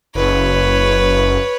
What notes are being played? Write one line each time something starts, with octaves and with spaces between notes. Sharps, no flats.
F#1 B4 C#5